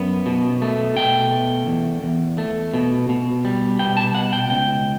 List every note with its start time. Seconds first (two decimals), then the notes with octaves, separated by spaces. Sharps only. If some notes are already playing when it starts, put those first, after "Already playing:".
Already playing: F#2 B3
0.26 B2
0.62 A3
0.96 B2 G5
1.32 A3
1.67 E2
2.03 E2
2.38 A3
2.74 B2
3.09 B2
3.45 G3
3.79 B2 G5
3.97 A5
4.15 B2 F#5
4.33 G5
4.49 C#2 G5